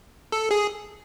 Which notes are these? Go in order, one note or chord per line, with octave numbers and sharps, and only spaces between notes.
A4
G#4